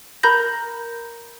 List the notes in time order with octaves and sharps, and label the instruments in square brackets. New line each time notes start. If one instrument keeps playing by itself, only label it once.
[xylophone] A#4 A#5 B5 G6 A#6